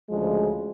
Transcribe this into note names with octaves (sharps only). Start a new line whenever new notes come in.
D2 C#3 F3 G#3